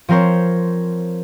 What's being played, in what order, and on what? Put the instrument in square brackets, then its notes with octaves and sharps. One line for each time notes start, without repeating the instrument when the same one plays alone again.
[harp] F3 C4 A#4 C5 C#5